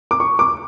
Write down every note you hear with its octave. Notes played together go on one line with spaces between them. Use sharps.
D6
C#6
D6